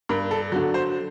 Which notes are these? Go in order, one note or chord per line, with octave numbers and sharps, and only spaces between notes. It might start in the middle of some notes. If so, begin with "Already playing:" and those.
G2 A#4
A4
D3 F#3
C5